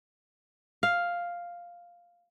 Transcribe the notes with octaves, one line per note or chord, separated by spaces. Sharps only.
F5